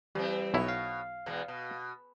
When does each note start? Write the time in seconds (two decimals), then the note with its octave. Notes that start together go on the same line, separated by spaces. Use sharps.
0.15 E3 G3 C4
0.54 B1 B2 E4 C#5
0.68 F5
1.26 E2 B2 G#3
1.48 B2